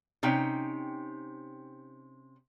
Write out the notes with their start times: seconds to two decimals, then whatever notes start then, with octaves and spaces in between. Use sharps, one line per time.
0.23 C3 C#4 D#4 G5